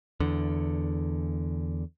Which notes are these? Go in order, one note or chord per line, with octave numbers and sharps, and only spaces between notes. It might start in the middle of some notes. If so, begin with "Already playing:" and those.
E2 D3